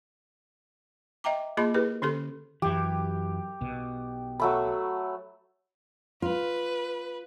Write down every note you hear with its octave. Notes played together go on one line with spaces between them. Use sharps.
D#5 E5 G5 A#5 D6
A#3 F4 G#4 D#5 B5 C6
E4 G4 G#4 A#4 B4
D3 C#4 G4 A4 C5 C6
F#2 E3 G4
B1 B2
F#3 A3 B5
F4 B4